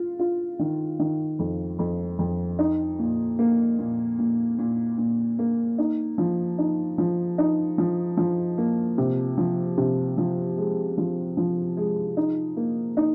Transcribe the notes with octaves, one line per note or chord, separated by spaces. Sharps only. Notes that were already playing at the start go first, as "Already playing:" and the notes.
Already playing: F4
F4
D#3
D#3
F2
F2
F2
D#4
A#2
A#3
A#2
A#2
A#2
A#2
A#3
D#4
F3
D#4
F3
D#4
F3
F3
A#3
C3
F3
C3
F3
G#3
F3
F3
G#3
D#4
A#3
D#4